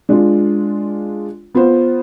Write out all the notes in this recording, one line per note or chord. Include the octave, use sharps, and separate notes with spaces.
G#3 D4 F4
B3 F4 C5